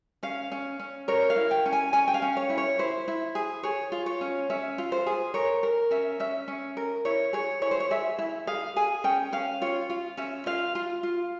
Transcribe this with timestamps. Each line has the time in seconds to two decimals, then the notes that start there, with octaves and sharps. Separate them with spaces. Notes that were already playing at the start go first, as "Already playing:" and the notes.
0.23 C#4 F5
0.52 C#4
0.80 C#4
1.08 A#4 C#5
1.30 F5
1.36 E4
1.51 G5
1.66 C#4
1.73 G#5
1.93 C#4 G#5
2.08 G5
2.14 F5
2.22 C#4
2.37 C#5
2.50 E4
2.58 C#5
2.79 E4 C5
3.08 E4
3.35 G#4
3.63 G#4 C#5
3.92 F4
4.06 C#5
4.21 C#4
4.50 C#4 E5
4.78 F4
4.92 C5
5.06 G#4
5.34 A#4 C#5
5.63 A#4
5.91 C#4 E5
6.20 C#4 E5
6.48 C#4
6.77 A#4
7.05 E4 C#5
7.33 G#4 C#5
7.62 E4 C#5
7.71 C5
7.80 C#5
7.91 G#4 E5
8.19 E4 E5
8.47 G#4 F5
8.76 G#4 G#5
9.04 C#4 G5
9.33 C#4 F5
9.62 F4 C#5
9.90 F4
10.17 C#4 E5
10.46 F4 F5
10.75 F4
11.03 F4